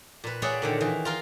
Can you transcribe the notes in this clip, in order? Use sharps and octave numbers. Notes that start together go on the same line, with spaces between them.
A#2 B4
G#4 C#5 D5 E5 F#5 G5
A#2 D3 D#3
D#3 E3
F4 A#4 C6